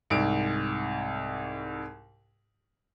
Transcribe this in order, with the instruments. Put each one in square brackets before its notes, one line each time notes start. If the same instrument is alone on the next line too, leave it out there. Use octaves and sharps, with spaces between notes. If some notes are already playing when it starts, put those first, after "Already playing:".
[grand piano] C2 G#2 D7